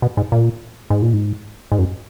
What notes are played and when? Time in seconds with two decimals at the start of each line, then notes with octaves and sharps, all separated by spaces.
0.02 B2
0.17 G#2
0.32 A#2
0.90 G#2
1.02 A#2
1.13 G#2
1.72 G#2
1.78 F#2